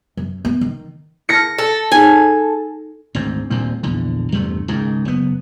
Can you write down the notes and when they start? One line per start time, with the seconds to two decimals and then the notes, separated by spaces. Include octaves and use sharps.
0.17 F#2
0.45 B3
0.61 D#3
1.29 E4 A5 F6 A#6 C#7
1.58 A4
1.92 D#4 G#4 C#5 G#5
3.15 G#1 D2 G#2 C4
3.50 D#1 D2 A#2 C4
3.83 A#1 E2 D3
4.32 E2 G2 C3 A3
4.68 C#2 G#2 D#3
5.05 F#1 B3